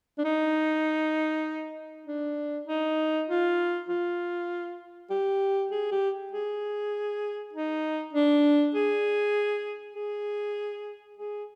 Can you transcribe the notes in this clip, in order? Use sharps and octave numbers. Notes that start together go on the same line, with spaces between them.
D4
D#4
D4
D#4
F4
F4
G4
G#4
G4
G#4
D#4
D4
G#4
G#4
G#4